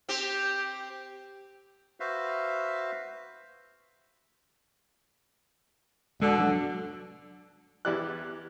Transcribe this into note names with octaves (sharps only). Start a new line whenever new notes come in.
C4 G4
F#4 B4 C5 E5 F5
D1 B2 D3 G#3
F1 F#3 D4
E2 E4 G4 D5 F#6